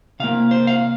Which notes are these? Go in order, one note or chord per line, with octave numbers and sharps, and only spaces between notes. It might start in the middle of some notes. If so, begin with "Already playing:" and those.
C3 A#3 F5
C5
F5